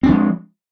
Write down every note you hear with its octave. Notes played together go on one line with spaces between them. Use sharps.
F3 G#3 C4 D4